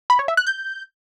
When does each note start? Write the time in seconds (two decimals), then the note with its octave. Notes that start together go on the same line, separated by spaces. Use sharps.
0.10 B5
0.19 C#5
0.28 E5
0.37 F#6
0.47 G6